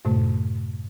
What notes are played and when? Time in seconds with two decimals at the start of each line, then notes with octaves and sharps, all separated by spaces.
0.05 F#2 A2 C3 A3